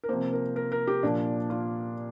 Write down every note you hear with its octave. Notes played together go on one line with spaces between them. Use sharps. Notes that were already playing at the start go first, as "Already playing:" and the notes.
A#4
C3 F3 A#3 C5
A#4
A#4
A#4
G4
A#2 F3 A#3 D4
F4